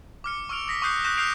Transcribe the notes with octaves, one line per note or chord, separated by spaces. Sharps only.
D6 F6 C#7
C#6 E6 F6 D7 F7
D#6 A#6 B6
C#6 D#6 F#6 G6 C7 C#7
C#6 F#6 G6 A#6 E7
F6 G6 B6 C7 D7 F7